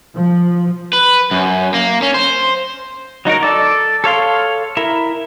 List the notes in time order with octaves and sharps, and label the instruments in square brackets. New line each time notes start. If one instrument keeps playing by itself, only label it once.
[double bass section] F3
[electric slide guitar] B4
F#2
A#3
C#4
C5
[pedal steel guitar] F#3 D#4 F#4 A#4
A4 D5
A4 C#5 F5 C6
E4 A#4